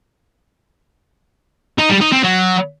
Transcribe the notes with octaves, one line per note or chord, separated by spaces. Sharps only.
D#4
G3
D#4
C4
F#3